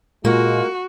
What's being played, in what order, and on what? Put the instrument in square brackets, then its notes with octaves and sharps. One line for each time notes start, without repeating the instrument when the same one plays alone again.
[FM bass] A#2 [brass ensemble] G#3 F4 [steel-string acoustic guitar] A#3 [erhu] F#4